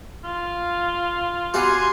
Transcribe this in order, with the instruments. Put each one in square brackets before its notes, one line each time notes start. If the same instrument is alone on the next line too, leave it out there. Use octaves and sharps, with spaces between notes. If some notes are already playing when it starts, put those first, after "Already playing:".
[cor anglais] F4
[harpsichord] G3 F#4 [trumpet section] G#5 C6